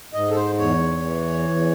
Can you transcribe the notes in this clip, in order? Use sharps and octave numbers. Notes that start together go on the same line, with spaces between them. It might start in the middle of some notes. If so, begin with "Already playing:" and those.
G#2 D#5
A4
C5
E2 C#5
E3
E2